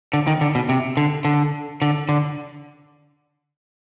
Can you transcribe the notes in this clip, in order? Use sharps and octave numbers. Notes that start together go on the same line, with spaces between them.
D3
D#3
D3
B2
C3
D3
D3
D3
D3